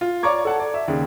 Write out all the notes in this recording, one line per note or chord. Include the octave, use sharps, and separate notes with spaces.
F4
C#5 D5 A#5 C#6 D6 G#6
A4 F#5 A5
D5
E5
D#2 C#3